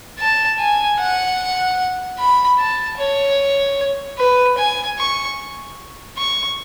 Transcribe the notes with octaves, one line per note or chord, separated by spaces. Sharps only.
A5
G#5
F#5
B5
A5
C#5
B4
G#5
C#6
C#6